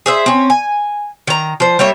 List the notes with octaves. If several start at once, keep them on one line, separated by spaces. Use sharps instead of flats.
G#4 C5 E5
C4 C#4
G#5
D#3 A#5
F3 C5
G3 A#3 C#5 E5